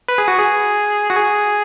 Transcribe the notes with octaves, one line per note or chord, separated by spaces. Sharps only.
B4
G#4
F#4
G#4
F#4
G#4